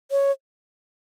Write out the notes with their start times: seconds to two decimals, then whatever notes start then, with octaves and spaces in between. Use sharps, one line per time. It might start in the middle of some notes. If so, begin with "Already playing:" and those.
0.11 C#5